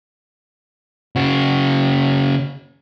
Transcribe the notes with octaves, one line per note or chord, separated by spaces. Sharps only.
C#3 F#4